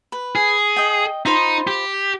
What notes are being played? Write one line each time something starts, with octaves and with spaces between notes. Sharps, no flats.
B4
G#4
D#5 G5
D#4 F4 C5 B5
G4